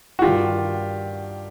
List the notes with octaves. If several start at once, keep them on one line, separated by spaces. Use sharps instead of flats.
F#4
G2 D#3 F4 G4